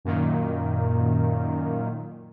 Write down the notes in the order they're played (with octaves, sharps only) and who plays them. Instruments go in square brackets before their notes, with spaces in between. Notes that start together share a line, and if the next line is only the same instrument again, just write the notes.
[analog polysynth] F#2 A#2 D#3